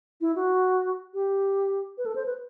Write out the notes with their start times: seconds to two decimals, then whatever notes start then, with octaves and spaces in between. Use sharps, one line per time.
0.21 E4
0.35 F#4
1.14 G4
1.98 B4
2.06 A4
2.15 C5
2.26 B4